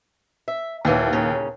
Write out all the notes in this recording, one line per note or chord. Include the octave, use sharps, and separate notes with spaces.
E5
D#2 A#2 E3 F#3
A#2 C#3 C#4